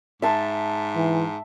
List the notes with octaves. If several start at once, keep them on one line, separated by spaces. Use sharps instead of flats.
G#2 E5 A5 C6
E3